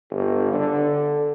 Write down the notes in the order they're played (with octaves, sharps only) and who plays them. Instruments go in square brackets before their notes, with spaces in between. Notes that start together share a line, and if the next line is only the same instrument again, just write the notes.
[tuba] G1
D3